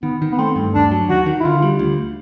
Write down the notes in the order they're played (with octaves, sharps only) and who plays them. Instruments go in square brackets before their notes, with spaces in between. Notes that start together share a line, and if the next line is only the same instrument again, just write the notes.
[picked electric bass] D#3 [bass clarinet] B3
[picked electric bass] D#3
[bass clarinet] B3
[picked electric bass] A3 [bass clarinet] C4
[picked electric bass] G2
[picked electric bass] D#2 [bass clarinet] D4
[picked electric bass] F#3
[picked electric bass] D#3 [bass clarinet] F#4
[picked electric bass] D#3
[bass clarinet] E4
[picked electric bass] D3 [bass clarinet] F4
[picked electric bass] G3
D2